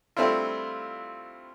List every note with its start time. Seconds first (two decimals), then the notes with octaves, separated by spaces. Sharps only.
0.17 G3 A3 C4 D4 E4 F4